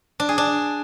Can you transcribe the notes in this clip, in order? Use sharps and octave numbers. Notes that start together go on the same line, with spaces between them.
D4
G#4
D4